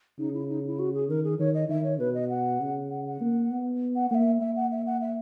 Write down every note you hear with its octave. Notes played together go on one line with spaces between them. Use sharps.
C#3 D#4
E4
D#4
E4
F#4
G#4
D#3 A#4
G#4
D#3 C#5
D#5
D#3 E5
C#5
B2 B4
D#5
F#5
C#3
F#5
F#5
A#3
B3
F#5
A#3 E5 F#5
A#3 E5
F#5
E5
F#5
E5